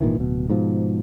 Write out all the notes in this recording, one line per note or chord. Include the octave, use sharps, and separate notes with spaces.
G#1 A#2 D#3 E3
D1 B2
G#2 B2 F3